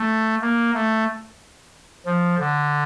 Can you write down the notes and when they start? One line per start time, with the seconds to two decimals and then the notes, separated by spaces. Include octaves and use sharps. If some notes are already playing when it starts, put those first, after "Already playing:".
Already playing: A3
0.42 A#3
0.75 A3
2.05 F3
2.39 D3